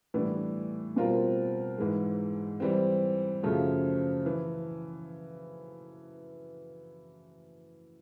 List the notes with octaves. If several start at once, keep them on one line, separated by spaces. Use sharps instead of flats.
A2 E3 G3 B3 D4
B2 G3 C4 F4 A#4
G#2 E3 G#3
E3 G3 C4
F#2 C#3 F3 A3
E3